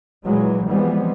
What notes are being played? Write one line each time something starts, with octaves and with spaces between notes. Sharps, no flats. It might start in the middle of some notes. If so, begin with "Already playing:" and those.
A#2 E3 F#3 G#3
E3 F3 G3 G#3 B3 C4